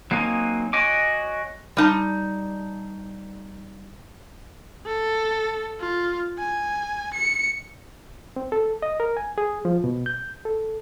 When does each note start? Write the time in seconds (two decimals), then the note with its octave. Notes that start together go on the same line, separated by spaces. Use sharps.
0.11 F#3 A#3 C4 D#4 G#5
0.73 F#4 C#5 D#5 G#5 D6
1.77 G3 D#4 A5
4.86 A4
5.80 F4
6.38 G#5
7.14 C#7
8.36 C4
8.52 A4
8.82 D#5
9.00 A#4
9.17 G#5
9.38 G#4
9.65 F3
9.84 B2
10.06 G6
10.45 A4